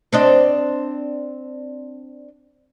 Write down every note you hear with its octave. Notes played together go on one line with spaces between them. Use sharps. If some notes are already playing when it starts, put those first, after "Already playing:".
C4 D4 D#5